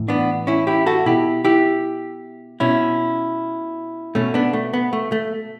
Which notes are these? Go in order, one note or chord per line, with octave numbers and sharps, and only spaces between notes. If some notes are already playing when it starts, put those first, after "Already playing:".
Already playing: A2 E3
B3 D4
C#4 E4
E4 G4
F#4 A4
B2 E4 G4
E4 G4
B2 C#4 E4
B2 A3 C#4
B3 D4
A3
B3
A3
A3